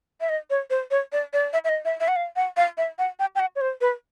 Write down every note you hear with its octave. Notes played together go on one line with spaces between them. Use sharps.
E5
D#5
C#5
C5
C#5
D5
D5
E5
E5
D#5
E5
E5
F#5
F5
F#5
F5
E5
F#5
G5
G5
F#5
C#5
C5
B4